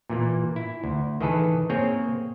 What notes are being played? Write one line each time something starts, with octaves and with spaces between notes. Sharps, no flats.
A#2 E3 A#3
E4
D2
D#3 E3 G#4 A4 B4
A#3 C4 G#4 C#5 G5